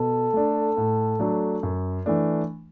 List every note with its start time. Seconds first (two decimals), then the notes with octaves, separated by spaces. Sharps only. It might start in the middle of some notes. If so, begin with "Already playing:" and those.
Already playing: B2 A4
0.33 A3 D4
0.77 A2
1.19 F#3 A3 D4
1.63 F#2
2.06 E3 A3 D4